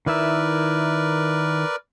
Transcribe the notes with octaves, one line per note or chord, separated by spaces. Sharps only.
D#3 E4 A#4 B4 D5 E5